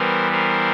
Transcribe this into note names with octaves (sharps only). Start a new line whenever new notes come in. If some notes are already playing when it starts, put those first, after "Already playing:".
Already playing: E3 G3 B3 A#4 C5
A#4 C5